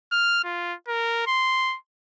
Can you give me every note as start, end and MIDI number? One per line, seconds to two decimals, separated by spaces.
0.12 0.43 89
0.44 0.74 65
0.88 1.24 70
1.27 1.76 84